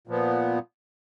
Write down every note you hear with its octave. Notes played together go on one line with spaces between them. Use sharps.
A#2 F3 B3